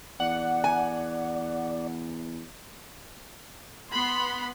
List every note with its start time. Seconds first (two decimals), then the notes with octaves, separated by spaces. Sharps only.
0.20 E2 D5 F#5
0.64 G#5
3.91 B3 F#5 B5 C6